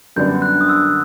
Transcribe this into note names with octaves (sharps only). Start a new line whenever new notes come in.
F#2 D3 G3 B3 D4 G6
F#6
D#6
E6